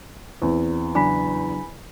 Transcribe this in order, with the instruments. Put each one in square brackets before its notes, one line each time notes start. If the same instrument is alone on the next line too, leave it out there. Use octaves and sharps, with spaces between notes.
[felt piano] E2 [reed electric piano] C4
[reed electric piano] C#3 F#3 D4 [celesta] G#5 B5 B6